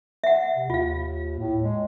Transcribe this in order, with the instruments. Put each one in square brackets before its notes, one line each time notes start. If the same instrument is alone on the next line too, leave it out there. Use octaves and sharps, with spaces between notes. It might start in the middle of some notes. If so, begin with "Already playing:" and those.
[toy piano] E5 F#5
[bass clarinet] C3
[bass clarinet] D#2 [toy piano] F4 F5
[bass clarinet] A2
G#3